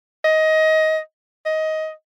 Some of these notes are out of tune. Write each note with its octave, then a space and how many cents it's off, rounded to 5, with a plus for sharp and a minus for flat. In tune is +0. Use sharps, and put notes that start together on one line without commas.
D#5 +20
D#5 +15